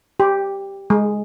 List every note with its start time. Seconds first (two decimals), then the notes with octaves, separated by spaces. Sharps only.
0.20 G4
0.90 G#3